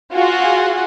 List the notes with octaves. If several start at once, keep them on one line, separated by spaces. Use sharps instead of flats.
F4 F#4 G#4 F#5